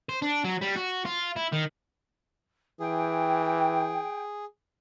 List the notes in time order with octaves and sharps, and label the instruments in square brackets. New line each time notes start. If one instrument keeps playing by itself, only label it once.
[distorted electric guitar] C5
D4
F#3
G3
F#4
F4
E4
D#3
[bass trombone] E3 [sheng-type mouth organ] G#4 [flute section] G5